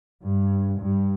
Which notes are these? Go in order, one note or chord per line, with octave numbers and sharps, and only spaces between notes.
G2
G2